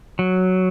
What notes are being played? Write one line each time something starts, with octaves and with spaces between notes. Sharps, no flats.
F#3